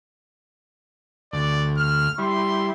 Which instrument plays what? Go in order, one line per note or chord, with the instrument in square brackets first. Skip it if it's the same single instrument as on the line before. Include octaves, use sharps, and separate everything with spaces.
[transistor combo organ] D2 [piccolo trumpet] D5
[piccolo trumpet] F6
[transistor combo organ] G3 E4 [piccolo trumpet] C6